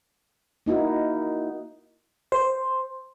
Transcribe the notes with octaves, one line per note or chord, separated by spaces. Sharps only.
A#3 D#4 E4 F#4
C5